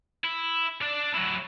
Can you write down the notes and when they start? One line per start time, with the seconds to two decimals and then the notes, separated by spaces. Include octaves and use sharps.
0.24 E4
0.82 D4 D5
1.14 F#3 E4